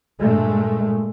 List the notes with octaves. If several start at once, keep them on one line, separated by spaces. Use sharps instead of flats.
G2 A#2 G#3 A3